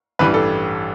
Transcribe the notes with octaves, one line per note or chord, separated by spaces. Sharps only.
A1 G2 E3 G3 B4
A4